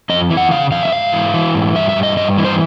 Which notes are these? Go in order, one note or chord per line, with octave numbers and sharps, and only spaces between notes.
F2 D#5
E3
F#5
C#3 F5
F2 F5
E5
G#2 F5
E3
E3
G#2
G2 E5
E5
G2
D#5
G2 D#5
E3
C5